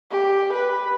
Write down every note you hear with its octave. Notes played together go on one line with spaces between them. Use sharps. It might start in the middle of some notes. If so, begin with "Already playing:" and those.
G4
B4